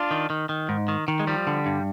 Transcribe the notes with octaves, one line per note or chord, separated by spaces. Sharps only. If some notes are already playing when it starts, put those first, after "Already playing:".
Already playing: D4 F4
D#3
D#3
D#3
G#2
D#3
D#3
G#3
F3 G3
D3
G2